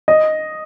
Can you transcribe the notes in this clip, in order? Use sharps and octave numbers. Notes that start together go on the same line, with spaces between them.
D#5